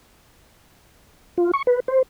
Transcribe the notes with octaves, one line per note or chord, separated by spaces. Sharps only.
F4
C#6
B4
C5